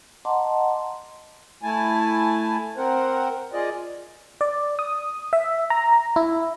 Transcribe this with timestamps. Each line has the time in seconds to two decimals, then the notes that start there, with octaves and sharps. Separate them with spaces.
0.25 D#5 F#5 A5 A#5 C6 D6
1.62 A3 E4 G#5 A5
2.77 C4 A#4 C5 F#5
3.53 F4 G#4 D5 D#5
4.41 D5
4.79 D#6
5.33 E5
5.70 A#5
6.16 E4